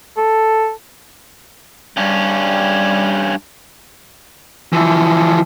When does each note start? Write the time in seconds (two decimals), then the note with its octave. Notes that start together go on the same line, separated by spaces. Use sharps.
0.17 A4
1.97 G2 G3 C#4
4.73 E3 F3